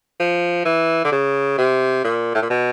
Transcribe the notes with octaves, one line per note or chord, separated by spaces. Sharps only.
F3
E3
D3
C#3
C3
A#2
A2
A#2
B2